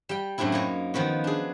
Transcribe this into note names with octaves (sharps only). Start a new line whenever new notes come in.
G3 G5
F#2 A2 A3 C4 D4 E4
A#3 D#4 C#5
D#3 F3 B3 F#4
D4 G#4